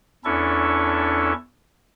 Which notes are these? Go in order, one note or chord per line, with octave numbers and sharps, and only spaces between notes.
E2 C#4 D4 E4 A4 C#6